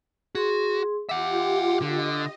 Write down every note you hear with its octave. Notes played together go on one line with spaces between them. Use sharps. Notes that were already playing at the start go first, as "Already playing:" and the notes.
F#4 G#4 C6
F4 G4 E5 F#5 D6
D3 D#5